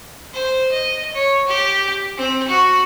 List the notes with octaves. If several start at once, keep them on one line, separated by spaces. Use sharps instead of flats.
C5
D#5
C#5
G4
C4
F#4